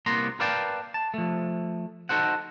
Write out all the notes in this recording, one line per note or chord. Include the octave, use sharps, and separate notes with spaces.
C2 A#3 B3 A#5 C6
A#4 B4 D5 F5 G5 A5
A5
F3 A3
D#4 F#4 A4 C5 F#5